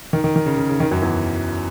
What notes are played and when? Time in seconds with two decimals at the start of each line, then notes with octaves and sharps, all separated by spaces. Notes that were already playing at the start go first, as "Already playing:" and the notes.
0.13 D#3
0.24 D#3
0.36 D#3
0.46 C#3
0.57 C#3
0.69 C#3
0.80 D#3
0.91 F#2 F#3
1.02 E2 E3